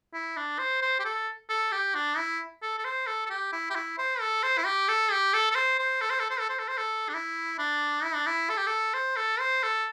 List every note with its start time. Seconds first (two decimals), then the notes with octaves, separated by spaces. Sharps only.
0.13 E4
0.37 D4
0.59 C5
0.82 C5
0.99 G4
1.05 A4
1.49 A4
1.72 G4
1.95 D4
2.17 E4
2.62 A4
2.79 A4
2.85 C5
3.07 A4
3.26 A4
3.30 G4
3.52 E4
3.70 G4
3.75 E4
3.98 C5
4.20 A4
4.43 C5
4.58 E4
4.66 G4
4.88 A4
5.11 G4
5.34 A4
5.51 A4
5.55 C5
5.79 C5
6.01 A4
6.10 C5
6.20 A4
6.30 C5
6.40 A4
6.49 C5
6.59 A4
6.68 C5
6.78 A4
7.09 D4
7.14 E4
7.59 D4
8.04 E4
8.15 D4
8.26 E4
8.49 A4
8.57 G4
8.67 A4
8.94 C5
9.17 A4
9.40 C5
9.63 A4